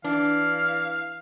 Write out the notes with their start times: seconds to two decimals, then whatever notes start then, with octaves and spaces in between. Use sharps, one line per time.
0.04 E3 D4 F5